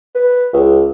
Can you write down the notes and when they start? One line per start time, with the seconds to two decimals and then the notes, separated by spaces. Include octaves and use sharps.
0.15 B4
0.53 C#2